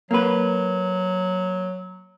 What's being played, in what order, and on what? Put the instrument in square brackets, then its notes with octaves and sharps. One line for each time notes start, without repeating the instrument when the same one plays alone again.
[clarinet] F#3 [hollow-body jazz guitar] A#3 B4